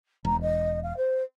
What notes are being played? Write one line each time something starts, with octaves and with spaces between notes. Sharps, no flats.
E1 A#5
D#5
F5
C5